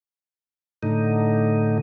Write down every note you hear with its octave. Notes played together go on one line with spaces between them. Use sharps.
A2 D3 D#4